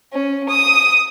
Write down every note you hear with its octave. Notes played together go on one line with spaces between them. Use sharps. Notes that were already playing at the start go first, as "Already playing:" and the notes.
C#4
D#6